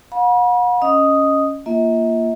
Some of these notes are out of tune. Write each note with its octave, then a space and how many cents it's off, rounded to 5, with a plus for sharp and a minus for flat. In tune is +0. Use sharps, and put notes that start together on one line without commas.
F#5 -45 B5 -40
C#4 +0 D#5 +0 D#6 +0
A#3 +0 F4 -25 E5 -45